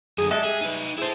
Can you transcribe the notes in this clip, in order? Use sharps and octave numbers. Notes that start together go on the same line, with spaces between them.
F#2 D3 G#4
G3 G#3 A4 E5
G#4
D#4 B4
E4 G#4 A4 C5